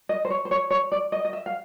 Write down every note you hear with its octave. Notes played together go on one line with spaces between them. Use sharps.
D#5
C5
C#5
C5
C#5
C#5
D5
D#5
D#5
E5
F5